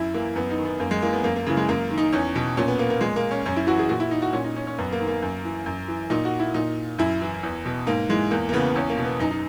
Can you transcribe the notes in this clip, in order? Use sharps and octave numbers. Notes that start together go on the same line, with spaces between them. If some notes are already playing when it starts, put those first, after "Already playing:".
Already playing: F#2 E4
E3 A#3
F#2 B3
D#4
D#3
B3
F#2 A#3
G#3
E3 A#3
B3
F#2 A#3
A#3
C#3 E3
G#3
F#2 A#3
D#3
D#4
E2 C#4
B2
A#2 C#4
B3
A#3
A#3
A#2 G#3
A#3
C#4
F#2 C#4
E4
E3 F#4
G#4
A#2 F#4
E4
D#4
F#4
A#2 C#4
D#4
C#4
C#4
F#2 B3
A#3
D#3
A#3
F#2
E3
F#2
E3
A#2 D#4
F#4
E4
A#2 D#4
F#2 E4
E3
E2
B2
G#2 A#3
E3 G#3
E2 A#3
A#3
C#3 E3 B3
E2 C#4
A#3
B2
B3
F#2 D#4
D#4